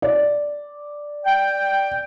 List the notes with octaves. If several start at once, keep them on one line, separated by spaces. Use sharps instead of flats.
D5
G5